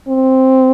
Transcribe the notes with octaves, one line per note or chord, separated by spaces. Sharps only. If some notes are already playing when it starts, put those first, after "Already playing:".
C4